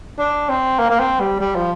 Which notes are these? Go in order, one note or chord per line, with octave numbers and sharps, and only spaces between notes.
D4
C4
A#3
A#3
C4
G3
G3
F3